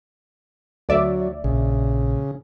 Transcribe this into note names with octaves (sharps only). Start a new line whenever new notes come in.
D2 F#3 D5 E5
A#1 C#3